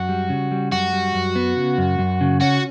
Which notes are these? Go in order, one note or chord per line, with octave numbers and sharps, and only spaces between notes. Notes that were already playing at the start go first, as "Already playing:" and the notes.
Already playing: F#2 F#4
G3
C#3
G3
F#2 F#4
G3
F#2
B3
C#3
F#2
F#2
C#3
C#4 F#4